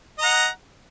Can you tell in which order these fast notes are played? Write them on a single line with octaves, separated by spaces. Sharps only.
D#5 A#5 F#5